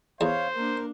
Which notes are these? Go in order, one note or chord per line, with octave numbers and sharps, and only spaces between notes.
E2 C5 C#5 F5
A#3 D4 A#4